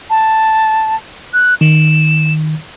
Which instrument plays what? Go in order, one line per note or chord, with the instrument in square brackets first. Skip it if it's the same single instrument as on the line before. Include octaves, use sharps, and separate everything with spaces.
[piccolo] A5
F#6
[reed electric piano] D#3 [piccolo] E7